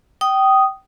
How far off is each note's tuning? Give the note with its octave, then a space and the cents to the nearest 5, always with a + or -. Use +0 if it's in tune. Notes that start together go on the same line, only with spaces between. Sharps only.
G5 -25 D#6 +0